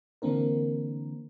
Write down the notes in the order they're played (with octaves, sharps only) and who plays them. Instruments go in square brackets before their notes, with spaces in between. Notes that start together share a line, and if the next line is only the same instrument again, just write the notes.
[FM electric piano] D3 E3 A#3 C4 D4 A#4